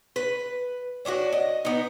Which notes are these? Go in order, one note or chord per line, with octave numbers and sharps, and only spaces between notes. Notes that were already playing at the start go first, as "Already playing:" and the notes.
B4
C#4 D4 E4 F#4
D#5
B3 D#4